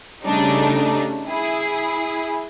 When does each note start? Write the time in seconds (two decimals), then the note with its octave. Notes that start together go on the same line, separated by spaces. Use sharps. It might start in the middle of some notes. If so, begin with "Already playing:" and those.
0.24 C#3 G3 A3 D4 D#4
1.28 E4 G#4